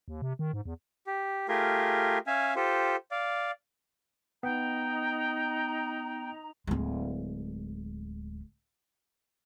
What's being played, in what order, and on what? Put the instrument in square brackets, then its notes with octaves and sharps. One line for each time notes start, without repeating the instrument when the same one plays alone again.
[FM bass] D#2
C3
D#3
G#2
E2
[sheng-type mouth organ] G4
A3 F4 G4 G#4 A#4
C#4 E5 F5 G#5
F4 G4 A4 C5
D5 F5
[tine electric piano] B3 [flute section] D#4 A#5 [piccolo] G5
[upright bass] D1 G#3